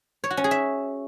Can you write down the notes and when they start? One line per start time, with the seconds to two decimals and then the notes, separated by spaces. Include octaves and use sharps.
0.24 C#5
0.30 F#4
0.37 C#4
0.44 G#4
0.51 E5